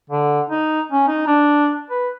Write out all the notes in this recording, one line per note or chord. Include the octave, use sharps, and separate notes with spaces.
D3
D#4
C#4
D#4
D4
B4